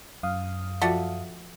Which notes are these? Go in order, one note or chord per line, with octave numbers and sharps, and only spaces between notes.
F#2 F5 D#6
F3 F4 F#4 A4 E5 F#5